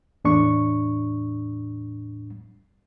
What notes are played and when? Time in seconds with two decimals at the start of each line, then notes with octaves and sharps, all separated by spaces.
0.25 E2 A2 D4 C#6